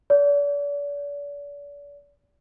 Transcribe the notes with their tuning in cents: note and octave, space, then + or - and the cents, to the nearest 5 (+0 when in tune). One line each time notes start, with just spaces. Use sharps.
D5 -40